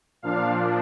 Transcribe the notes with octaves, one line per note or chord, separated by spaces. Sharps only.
A#2 F3 D4 F5